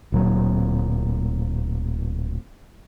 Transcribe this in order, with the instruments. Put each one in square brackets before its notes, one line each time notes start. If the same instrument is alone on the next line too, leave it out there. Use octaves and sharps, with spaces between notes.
[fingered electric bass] D1 A#2 F#3